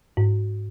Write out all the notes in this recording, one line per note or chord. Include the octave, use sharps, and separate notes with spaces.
G#2